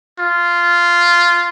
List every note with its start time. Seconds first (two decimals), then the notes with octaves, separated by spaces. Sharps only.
0.19 F4